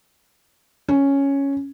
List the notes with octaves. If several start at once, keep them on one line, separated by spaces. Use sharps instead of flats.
C#4